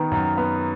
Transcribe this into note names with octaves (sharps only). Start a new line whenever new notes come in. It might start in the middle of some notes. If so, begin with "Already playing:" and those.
Already playing: D#3 B3
F#2
B3